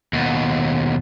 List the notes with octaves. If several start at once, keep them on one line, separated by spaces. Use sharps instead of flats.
D#2 B2